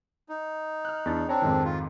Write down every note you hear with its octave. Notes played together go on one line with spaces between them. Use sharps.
D#4
F6 F#6
E2 D4 A6
C4 D4 C#5 A#5
F2 G#2 D#3
F4